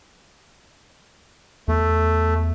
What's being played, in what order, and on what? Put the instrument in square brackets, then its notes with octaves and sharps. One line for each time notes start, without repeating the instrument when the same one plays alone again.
[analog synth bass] E2 [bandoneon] A3